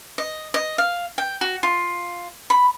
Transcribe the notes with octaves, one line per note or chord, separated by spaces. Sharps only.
D#5
D#5
F5
G5
F#4
F4
B5